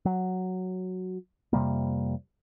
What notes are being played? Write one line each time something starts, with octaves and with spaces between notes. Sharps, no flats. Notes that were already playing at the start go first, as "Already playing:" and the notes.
F#3
F2 C3 G3 A#3